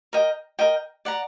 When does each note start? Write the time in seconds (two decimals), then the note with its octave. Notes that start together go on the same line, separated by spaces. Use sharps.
0.13 A#4 D#5 G5
0.59 A#4 D#5 G5
1.05 D5 F#5 A#5